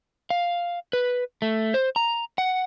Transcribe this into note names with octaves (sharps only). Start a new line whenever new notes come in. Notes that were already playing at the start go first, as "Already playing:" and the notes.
F5
B4
A3
C5
A#5
F#5